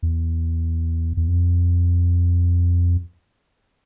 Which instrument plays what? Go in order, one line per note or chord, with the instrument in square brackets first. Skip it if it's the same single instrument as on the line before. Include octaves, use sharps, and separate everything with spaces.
[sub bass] E2
E2
F2